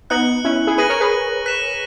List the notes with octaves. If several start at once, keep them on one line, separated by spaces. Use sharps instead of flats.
B3 D#4 F#6 C#7 F#7
C#4 E4
E4 G#4
G#4 B4 F#6 A#6 D#7 F#7
A#4 C#5
G#4 B4
F#6 B6 E7